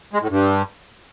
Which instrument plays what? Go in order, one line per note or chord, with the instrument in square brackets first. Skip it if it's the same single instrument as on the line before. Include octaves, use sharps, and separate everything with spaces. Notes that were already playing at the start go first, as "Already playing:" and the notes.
[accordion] G#3
A2
G2